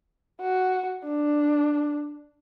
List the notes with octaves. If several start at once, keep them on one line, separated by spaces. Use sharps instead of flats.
F#4
D4